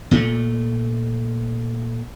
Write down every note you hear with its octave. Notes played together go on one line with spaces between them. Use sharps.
A#2 A3